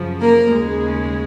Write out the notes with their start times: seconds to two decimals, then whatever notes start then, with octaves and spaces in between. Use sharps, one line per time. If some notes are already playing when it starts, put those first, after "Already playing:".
Already playing: F#2 C#3 F3
0.21 A#3 A#4
0.50 D#2 C#3 G#3